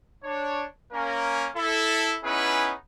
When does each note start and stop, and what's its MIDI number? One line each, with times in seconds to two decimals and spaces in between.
0.23 0.65 62
0.23 0.65 73
0.92 1.48 58
0.92 1.48 61
0.92 1.48 70
1.56 2.17 64
1.56 2.17 69
2.24 2.73 59
2.24 2.73 61
2.24 2.73 63
2.24 2.73 64
2.24 2.73 68
2.24 2.73 71